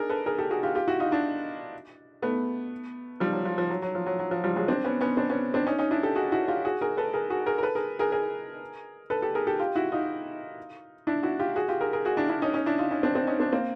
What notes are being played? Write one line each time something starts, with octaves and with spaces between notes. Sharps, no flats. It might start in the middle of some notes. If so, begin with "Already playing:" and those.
Already playing: D4 G#4 A#4
A4 B4
G#4 A#4
G4 A4
F#4 G#4
F4 G4
F4 G4
E4 F#4
D#4 F4
D4 E4
A3 B3
F3 G3
F#3
F3
F3
F#3
F#3
F3
F#3
F#3
F3
F3 G3
F#3 G#3
C4 D4
B3 C#4
B3 C#4
C4 D4
B3 C#4
C4 D4
C#4 D#4
C#4 D#4
D4 E4
G4 A4
F#4 G#4
E4 F#4
F4 G4
F#4 G#4
G#4 A#4
A4 B4
G#4 A#4
F#4 G#4
G#4 A#4
A#4
A4 B4
G#4 A#4
G#4 A#4
G#4 A#4
A4 B4
G4 A4
G#4 A#4
G4 A4
F4 G4
E4 F#4
D#4 F4
D4 E4
E4 F#4
F4 G4
F#4 G#4
F4 G4
G#4 A#4
G#4 A#4
F#4 G#4
D4 E4
D4 E4
C#4 D#4
C#4 D#4
D4 E4
D#4 F4
C#4 D#4
C4 D4
C4 D4
C#4 D#4
C4 D4
A#3 C4